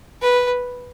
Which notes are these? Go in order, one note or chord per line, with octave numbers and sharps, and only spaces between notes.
B4